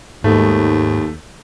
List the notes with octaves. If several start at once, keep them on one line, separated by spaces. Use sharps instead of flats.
D#2 G#2 A3